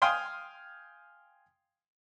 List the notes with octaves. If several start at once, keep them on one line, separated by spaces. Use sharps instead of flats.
F5 G5 G#5 C6 D#6